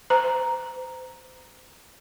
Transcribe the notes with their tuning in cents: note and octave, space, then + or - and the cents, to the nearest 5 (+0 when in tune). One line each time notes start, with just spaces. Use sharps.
C5 -35 A#5 +0